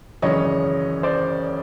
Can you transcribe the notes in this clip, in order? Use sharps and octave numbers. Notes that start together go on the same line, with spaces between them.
G#1 F#2 C#3 E3 C#5 D#5
C5 D5